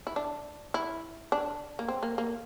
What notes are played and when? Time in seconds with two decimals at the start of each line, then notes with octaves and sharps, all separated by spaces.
0.07 E4
0.16 D4
0.74 E4
1.32 D4
1.79 A#3
1.88 C4
2.03 A#3
2.18 A#3